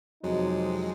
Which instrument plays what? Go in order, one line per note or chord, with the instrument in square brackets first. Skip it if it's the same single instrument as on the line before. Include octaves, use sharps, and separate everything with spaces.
[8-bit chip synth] F2 G#3 [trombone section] C3 D#4 [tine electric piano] F#3 [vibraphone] F#4 D#5